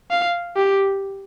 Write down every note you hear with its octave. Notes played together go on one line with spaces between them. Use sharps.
F5
G4